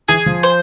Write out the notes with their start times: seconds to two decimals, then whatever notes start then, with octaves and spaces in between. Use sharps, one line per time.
0.09 E3 G#4
0.26 F3
0.43 C5